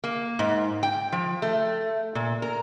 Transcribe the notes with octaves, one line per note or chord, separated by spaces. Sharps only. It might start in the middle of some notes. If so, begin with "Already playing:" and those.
A#3
G#2
G5
F3
A3
A#2
A#4